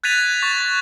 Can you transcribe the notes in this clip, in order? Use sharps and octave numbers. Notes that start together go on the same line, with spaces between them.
F#6 G#6 A6 B6 D#7 F7
C#6 A6